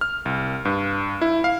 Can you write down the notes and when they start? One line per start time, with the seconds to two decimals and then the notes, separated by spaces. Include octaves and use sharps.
0.01 F6
0.25 C2
0.65 G2
1.21 E4
1.44 F5